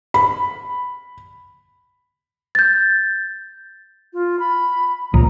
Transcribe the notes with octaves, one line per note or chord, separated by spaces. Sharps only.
B5
G6 A6
F4
B5
C#2 A#2 F3 A#5